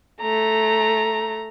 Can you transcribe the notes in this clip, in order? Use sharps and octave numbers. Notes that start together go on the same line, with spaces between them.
A3 A#5